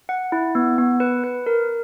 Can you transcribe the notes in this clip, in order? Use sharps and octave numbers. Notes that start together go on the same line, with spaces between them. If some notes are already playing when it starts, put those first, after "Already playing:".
F#5
E4
B3
B3
B4
B4
A#4